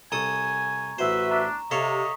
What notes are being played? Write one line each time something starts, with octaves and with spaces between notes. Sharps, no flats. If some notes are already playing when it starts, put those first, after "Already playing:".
C2 A4 G#5 A#5 C#6 D#6
A1 F#4 B4 C5 E5
D4 A#5
C3 A4 C#5 D#5 F5 C#6 D#6 B6